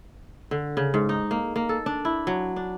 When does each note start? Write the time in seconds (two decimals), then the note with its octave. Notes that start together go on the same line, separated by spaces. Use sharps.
0.51 D3
0.77 C#3
0.94 G#2
1.09 D#4
1.31 A#3
1.56 A#3
1.69 A4
1.86 D4
2.05 E4
2.27 F#3
2.56 D4